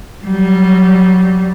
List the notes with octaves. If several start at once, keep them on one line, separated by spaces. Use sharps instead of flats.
F#3 G3